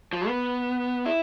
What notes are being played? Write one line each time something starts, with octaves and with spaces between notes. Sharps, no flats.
F3
B3
E4